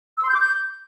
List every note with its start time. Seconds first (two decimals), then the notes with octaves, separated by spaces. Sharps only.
0.18 E6
0.23 C6
0.29 G6
0.34 D6
0.40 G6